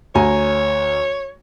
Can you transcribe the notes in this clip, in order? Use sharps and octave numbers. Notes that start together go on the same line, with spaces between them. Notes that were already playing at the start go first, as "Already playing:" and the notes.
D2 C#5 G#5 A#5